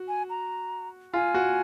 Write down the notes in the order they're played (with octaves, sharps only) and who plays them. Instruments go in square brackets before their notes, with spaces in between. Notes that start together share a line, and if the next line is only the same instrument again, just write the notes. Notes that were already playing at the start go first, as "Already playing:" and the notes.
Already playing: [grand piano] F#4
[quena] G#5
A#5
[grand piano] F4 [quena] G#5
[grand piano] F#4